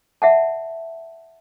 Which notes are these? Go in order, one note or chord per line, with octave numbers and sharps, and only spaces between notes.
E5 F#5 A5